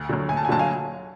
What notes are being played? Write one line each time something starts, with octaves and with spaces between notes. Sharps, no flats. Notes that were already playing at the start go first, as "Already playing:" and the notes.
Already playing: D2 F#5
D3 F#3
D2 G#5
A5
G#5
D3 F#3 A5
F5 G#5